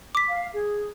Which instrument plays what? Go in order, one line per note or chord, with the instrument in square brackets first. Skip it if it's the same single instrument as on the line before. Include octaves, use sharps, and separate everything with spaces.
[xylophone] D6 B6
[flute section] F5
G#4